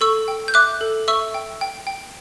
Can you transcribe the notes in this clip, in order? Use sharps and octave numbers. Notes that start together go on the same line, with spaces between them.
A4 C#6 E6
G5
G6
E5 D6 F#6
A4
E5 C#6 E6
G5
G5
G5